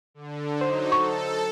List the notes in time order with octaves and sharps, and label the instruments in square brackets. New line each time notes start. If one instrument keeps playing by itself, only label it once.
[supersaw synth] D3
[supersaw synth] F#3 D#4 [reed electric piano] C5
[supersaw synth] A4 [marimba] C#6